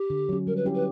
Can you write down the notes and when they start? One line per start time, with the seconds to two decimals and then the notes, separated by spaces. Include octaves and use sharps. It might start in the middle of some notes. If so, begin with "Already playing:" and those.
Already playing: G4
0.10 D3
0.29 F#3 C#4
0.47 G3 A#4
0.56 B4
0.65 C#4 E4 G4
0.75 B4